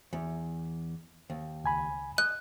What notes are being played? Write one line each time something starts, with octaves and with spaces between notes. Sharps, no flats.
E2
D#2
C#2 G#5 B5
D#5 F#6